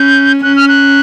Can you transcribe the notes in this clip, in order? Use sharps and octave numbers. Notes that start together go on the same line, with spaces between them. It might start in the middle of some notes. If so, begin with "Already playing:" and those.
Already playing: C#4 G6
C#4 F#6
F6
F#6